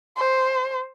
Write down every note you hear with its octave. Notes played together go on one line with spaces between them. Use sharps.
C5